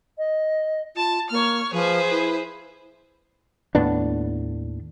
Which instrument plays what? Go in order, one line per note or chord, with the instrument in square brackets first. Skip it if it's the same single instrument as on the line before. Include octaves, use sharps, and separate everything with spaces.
[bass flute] D#5
[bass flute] F4 [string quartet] A5
[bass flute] A#3 [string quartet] C#5 F6
[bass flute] F3 [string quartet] G#4 B4 C5
[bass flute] E4
[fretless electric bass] D#2 A2 B3 D4